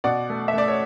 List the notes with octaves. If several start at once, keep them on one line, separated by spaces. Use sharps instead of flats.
B2 D5 F#5
A3
E5
A3 D5
C#5